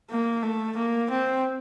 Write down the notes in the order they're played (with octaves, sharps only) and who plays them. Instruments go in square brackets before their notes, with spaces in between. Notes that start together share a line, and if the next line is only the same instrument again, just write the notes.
[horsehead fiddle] A#3
A3
A#3
C4